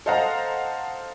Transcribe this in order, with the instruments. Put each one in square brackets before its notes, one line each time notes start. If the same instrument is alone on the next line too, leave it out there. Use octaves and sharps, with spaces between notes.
[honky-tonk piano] A4 C5 D#5 F5 F#5 A#5